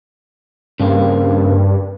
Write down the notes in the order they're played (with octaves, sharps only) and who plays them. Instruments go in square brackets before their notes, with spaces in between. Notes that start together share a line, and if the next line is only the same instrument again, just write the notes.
[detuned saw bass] G2 [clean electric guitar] C#3 A#3 C4